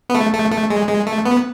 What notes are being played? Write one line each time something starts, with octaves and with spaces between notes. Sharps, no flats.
B3
A3
A3
A3
G#3
G#3
A3
B3